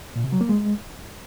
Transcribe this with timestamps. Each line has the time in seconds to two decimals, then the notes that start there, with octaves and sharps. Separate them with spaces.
0.16 A#2
0.24 C3
0.32 F#3
0.41 A#3
0.49 G#3